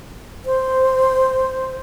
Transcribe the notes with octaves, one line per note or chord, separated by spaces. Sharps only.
C5